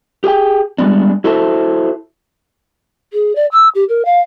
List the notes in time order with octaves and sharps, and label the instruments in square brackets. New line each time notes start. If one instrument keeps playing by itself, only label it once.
[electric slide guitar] G4 G#4 E5 G5
G3 G#3 B3 D4
E4 F#4 A4 C5 E5 A5
[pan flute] G#4
D5
E6
G4
A#4
F5